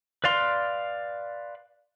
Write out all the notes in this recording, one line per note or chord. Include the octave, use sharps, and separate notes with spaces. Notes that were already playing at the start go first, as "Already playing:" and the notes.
B4 D5 F5 C6